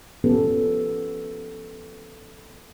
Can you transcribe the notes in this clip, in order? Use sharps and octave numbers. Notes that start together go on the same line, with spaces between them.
F3 B3 C#4 G4 A4 B4